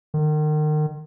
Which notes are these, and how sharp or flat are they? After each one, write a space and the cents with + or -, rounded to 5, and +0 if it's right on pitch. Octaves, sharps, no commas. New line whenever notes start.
D#3 -35